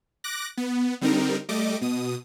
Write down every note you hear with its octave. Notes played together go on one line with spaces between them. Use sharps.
D6 F#6 A#6
B3
D3 G3 C4 D#4 A#4
G3 A3 D#5 D6
B2 D#6